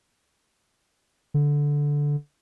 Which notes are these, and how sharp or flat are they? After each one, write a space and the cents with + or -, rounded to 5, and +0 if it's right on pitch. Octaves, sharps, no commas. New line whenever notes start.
D3 -10